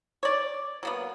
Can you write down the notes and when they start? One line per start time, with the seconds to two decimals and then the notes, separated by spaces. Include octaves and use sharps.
0.23 C#5 D5
0.83 F#3 A#3 B3